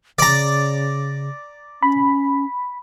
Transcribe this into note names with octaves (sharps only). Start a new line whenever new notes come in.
C#3 D5 A#5
C#4 B5